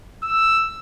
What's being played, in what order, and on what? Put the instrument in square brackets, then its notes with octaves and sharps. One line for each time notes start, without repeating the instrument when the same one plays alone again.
[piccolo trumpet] E6